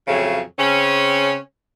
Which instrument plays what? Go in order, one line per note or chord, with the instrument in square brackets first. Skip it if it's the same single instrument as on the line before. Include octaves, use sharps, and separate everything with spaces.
[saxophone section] F2 A2 C#3 F3 F#3
C#3 C4 C#4